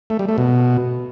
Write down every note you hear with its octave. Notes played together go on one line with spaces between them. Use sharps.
A3
G3
A3
B2